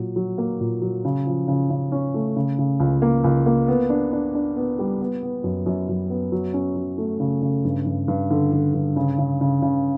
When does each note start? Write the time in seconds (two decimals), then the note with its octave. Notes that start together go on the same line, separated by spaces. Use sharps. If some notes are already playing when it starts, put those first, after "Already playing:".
Already playing: A#2 F#3
0.16 F#3
0.38 A#3
0.60 A#2
0.82 F#3
1.05 C#3
1.26 F3
1.48 C#3
1.70 C#3
1.92 C#4
2.14 A3
2.36 C#3
2.59 C#3
2.80 C#2
3.02 A#3
3.24 C#2
3.46 A#3
3.68 B3
3.90 D4
4.12 D4
4.35 D4
4.56 B3
4.79 G3
5.01 B3
5.23 B3
5.44 F#2
5.66 F#2
5.89 F#2
6.10 B3
6.32 F#3
6.54 C#4
6.76 F#3
6.98 A3
7.20 C#3
7.42 C#3
7.65 G2
7.86 G2
8.08 G2
8.30 D3
8.52 D3
8.74 G2
8.96 C#3
9.18 C#3
9.41 C#3
9.62 C#3